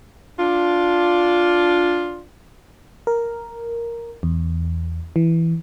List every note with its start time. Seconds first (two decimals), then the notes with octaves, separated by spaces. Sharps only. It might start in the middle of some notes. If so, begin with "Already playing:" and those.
0.39 D4 F4
3.07 A#4
4.23 E2
5.16 E3